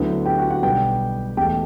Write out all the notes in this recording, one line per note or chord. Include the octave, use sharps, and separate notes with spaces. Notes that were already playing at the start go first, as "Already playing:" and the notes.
Already playing: D2 D3 F#3 B3 E4
G4 G5
F#4 F#5
F#4 F#5
B1 B2 G3 B3 G4 G5
E1 E2 B2 A3 G4 G5